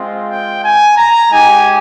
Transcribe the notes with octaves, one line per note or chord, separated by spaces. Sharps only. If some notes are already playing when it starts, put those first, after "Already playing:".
Already playing: G#3 C4 F4
G5
G#5
A#5
G#3 D#4 G4 G#5